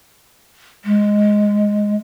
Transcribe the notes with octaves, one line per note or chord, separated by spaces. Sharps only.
G#3